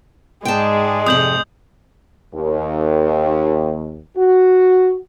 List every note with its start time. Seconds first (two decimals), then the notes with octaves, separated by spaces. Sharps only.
0.45 G#2 G#3 G#4 D5 G5 A5
1.06 F2 C3 D#6 G6 F#7
2.33 D#2
4.17 F#4